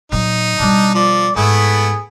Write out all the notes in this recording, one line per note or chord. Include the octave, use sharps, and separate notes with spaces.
A#2 F#3 D#4
B2 G3 D4
F3 D5
G#2 A3 B3 E4 G#4